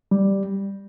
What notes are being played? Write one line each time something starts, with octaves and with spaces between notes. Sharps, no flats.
G3